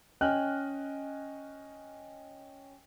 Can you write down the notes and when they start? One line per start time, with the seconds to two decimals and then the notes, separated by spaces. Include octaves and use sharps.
0.21 C#4 D#5 G5 G#5 F6 F#6